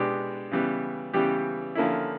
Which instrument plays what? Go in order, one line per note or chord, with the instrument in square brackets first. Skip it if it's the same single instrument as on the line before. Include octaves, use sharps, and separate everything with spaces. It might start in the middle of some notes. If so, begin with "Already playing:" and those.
Already playing: [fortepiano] B2 G#3 B3 D4 G4
C#3 E3 G3 B3
C#3 E3 G3 B3 G4
D3 F3 A#3 C#4 E4